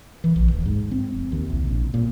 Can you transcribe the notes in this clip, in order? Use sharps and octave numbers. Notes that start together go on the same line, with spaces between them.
E3
A#1
D1
G#2
C4
F1
D#2
C2
A#1
A#2